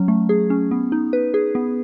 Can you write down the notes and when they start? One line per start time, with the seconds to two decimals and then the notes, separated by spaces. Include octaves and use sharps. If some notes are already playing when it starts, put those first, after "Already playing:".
Already playing: F#3 C#4
0.08 A3
0.29 G#4
0.50 C#4
0.71 B3
0.92 D#4
1.13 B4
1.34 G#4
1.55 B3